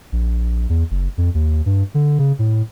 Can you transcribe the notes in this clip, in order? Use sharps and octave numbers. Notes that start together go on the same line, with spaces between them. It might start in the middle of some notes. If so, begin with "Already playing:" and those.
A#1
E2
F#1
F2
D#2
G2
D3
C#3
A2